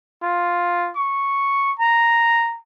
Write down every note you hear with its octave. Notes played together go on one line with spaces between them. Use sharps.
F4
C#6
A#5